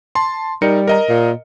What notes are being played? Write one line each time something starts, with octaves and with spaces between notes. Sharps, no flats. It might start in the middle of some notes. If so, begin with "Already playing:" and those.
A5 C6
G3 D#4 A#4 C#7
A#4 D#5 A#5
A#2